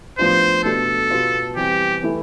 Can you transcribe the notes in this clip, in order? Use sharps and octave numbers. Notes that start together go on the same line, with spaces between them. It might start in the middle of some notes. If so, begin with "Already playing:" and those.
A2 F3 B3 D4 F4 C5
B2 A3 D4 A4
B2 B3 F4
E3 G3 C4 G4
E3 A3 E4